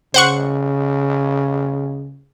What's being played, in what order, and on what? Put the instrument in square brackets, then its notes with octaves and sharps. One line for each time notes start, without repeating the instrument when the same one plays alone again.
[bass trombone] C#3 [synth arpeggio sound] C5 F#5 C#6